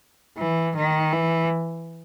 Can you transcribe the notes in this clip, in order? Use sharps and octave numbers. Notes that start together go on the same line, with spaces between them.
E3
D#3
E3